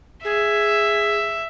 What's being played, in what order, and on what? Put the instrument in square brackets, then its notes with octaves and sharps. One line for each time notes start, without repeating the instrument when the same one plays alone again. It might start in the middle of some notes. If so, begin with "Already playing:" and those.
[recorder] G#4 [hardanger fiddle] E5